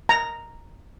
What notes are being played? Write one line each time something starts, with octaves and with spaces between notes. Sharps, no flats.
A#5